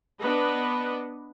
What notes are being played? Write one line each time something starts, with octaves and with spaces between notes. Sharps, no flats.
B3 D4 B4 D#5